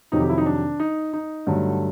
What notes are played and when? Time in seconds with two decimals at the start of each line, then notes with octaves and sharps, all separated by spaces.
0.12 F2 C3 D#3 F#3 D#4
0.20 G4
0.29 E4
0.38 D#4
0.46 D4
0.80 D#4
1.13 D#4
1.47 G2 D3 F#3 A3